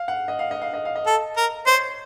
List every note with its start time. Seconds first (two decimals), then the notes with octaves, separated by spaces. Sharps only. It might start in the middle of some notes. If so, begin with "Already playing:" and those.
Already playing: F5
0.08 F#5
0.28 D#5
0.39 F5
0.51 D#5
0.62 F5
0.74 D#5
0.85 F5
0.96 D#5
1.07 A4
1.37 A#4
1.66 C5 C#5